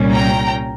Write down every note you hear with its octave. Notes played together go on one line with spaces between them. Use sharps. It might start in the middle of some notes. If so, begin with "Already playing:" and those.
Already playing: C2 A#2 G3 C#4
G5 A#5